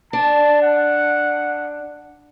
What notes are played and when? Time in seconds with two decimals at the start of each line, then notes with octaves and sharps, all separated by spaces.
0.13 D4 A5
0.62 F#5